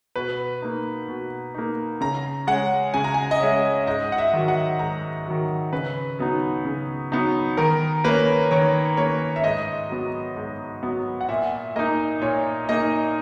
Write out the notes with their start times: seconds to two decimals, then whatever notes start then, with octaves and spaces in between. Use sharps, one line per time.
0.16 B2 B4
0.62 A#3 D#4
1.09 B2
1.55 A#3 D#4
2.01 C#3 A#5
2.47 G#3 C#4 F#5
2.94 C#3 G#5
3.04 A#5
3.14 G#5
3.31 D#5
3.40 G#3 C#4 E5
3.87 G#2 D#5
4.12 F#5
4.18 E5
4.33 D#3 F#3
4.48 F#5
4.79 G#2 A#5
5.26 D#3 F#3
5.73 C#3 B4
6.19 F#3 B3 D#4
6.65 C#3
7.12 F#3 B3 D#4
7.57 D#3 A#4
8.04 A#3 C#4 B4
8.51 D#3 C#5
8.97 A#3 C#4 C#5
9.36 E5
9.44 G#2 D#5
9.90 F#3 B3
10.37 G#2
10.83 F#3 B3
11.21 F#5
11.29 A#2 E5
11.76 A#3 D#4 D#5
12.22 A#2 C#5
12.69 A#3 D#4 D#5